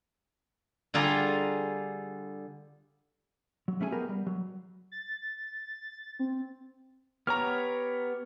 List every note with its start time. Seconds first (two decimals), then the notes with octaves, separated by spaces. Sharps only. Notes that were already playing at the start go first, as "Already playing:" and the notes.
0.94 D3 G3 F4 G#4 A#5
3.68 F#3
3.80 G3 A3 C#4 E4 G#4 G#5
3.92 B3 G4 G#4 A#4
4.09 G3
4.27 F#3
4.92 A6
6.19 C4
7.27 B3 G4 C#5 A#5 F6